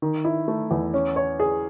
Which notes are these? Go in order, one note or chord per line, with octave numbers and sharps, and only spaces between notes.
D#3
E4
A3
E2
C#4
C#5
G#4